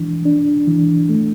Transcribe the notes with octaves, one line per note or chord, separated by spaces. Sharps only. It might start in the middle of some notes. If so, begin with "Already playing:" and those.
Already playing: E3 D4
D4
E3
A3